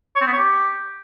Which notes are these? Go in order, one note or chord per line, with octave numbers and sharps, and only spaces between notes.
C#5
C4
B3
C#5
G4